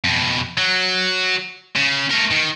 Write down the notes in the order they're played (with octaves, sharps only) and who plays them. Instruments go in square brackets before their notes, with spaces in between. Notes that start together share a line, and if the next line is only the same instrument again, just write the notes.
[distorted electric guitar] F2 B2
F#3
C#3
A3 A#4
D#3